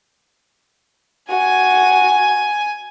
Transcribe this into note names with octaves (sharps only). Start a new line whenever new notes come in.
F#4 G#5